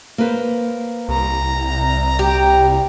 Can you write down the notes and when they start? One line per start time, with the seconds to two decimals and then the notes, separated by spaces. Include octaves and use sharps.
0.18 A#3 B4 C5
1.09 C2 A#5
2.19 G4